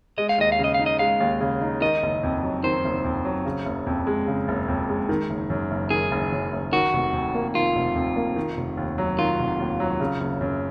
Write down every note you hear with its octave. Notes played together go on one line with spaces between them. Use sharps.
G#3 D#5
F5
D#2 D#5
F5
C#3 D#5
D#4 F5
D#5
G#3 F5
D#2
C#3
D#4
D#3 D#5
F#1
F2
F#3
D#3 C5
F#1
F2
F#3
C#3
F#1
F2
G#3
C#3
F#1
F2
G#3
D#3
F#1
F#2
F#1
D#3 G#4
F#1
F#2
F#1
D#3 F#4
F1
F2
A#3
D#3 F4
F1
F2
A#3
D#3
F1
D#2
F#3
D#3 F4
F1
D#2
F#3
C#3
F#1
F#2